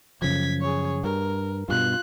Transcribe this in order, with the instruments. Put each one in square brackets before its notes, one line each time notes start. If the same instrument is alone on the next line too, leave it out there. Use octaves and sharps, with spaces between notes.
[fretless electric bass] F#2 C#3 F3 [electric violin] G#6 B6
[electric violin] G#4 C#5
[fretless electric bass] G2 [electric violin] A#4
[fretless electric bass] G2 B2 [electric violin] F4 F#6